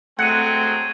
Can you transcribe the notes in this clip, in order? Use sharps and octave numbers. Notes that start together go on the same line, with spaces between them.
F#3 G#3 A3 C4 F#5 G#6 D#7